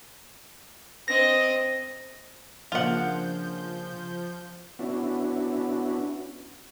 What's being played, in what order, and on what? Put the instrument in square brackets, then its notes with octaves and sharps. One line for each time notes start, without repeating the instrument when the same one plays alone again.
[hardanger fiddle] C4 D#5 [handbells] A#6
[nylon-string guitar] C#3 A#3 D4 [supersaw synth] F3 G6 [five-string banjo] F4 F#5
[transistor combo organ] B3 C#4 D4 E4 F#4